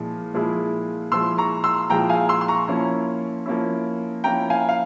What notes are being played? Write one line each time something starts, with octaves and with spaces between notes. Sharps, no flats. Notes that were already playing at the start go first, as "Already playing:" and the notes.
Already playing: A#2 F3 G#3 E4
A#2 F3 G#3 E4
A#2 F3 G#3 E4 C6 E6
A#5 C#6
C6 E6
A#2 F3 G#3 E4 G5 A#5
F5 G#5
C6 E6
C6
A#5 C#6
F3 A#3 C#4 E4
F3 A#3 C#4 E4
F3 A#3 C#4 E4 G5 A#5
F5 G#5
F5